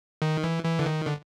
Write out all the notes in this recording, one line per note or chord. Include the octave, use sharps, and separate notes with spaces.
D#3
E3
E3
D3
D#3
D3